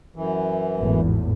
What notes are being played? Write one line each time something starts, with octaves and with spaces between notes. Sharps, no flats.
F#2 E3
G#1 E2 A2